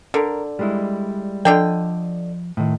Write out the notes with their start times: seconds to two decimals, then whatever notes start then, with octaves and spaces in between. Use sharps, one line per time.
0.14 D3 A#4
0.59 G3 G#3 E4
1.45 D3 F3 D4 D#5 G5
2.57 A2 D#3